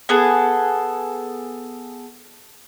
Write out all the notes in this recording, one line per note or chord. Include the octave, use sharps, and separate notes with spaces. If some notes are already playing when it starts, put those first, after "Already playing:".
B3 G#4 A4